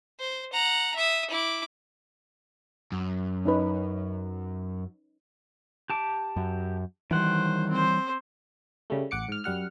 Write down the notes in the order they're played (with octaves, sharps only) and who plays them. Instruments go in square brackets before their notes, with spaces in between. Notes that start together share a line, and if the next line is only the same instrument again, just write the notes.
[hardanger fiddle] C5
F#5 A#5
E5 D#6
E4 D6
[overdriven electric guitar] F#2
[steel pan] C#4 D#4 B4
[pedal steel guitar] G4 A5 D6
[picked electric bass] F#2
[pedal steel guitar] D#3 F#5 [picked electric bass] E3 G3 [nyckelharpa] C5
[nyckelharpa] C4 C5
[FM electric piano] C#3 G3 A3
A1 F#5 D6 C#7
G#2 F6
F#2 G3 F#5 F6